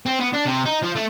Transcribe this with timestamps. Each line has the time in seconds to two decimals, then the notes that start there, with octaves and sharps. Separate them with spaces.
0.06 C4
0.20 B3
0.33 D4
0.45 C3
0.65 D#4
0.82 F3
0.95 A3